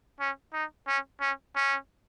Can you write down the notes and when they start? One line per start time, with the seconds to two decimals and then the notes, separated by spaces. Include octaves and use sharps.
0.20 C#4
0.53 D#4
0.88 C#4
1.21 C#4
1.56 C#4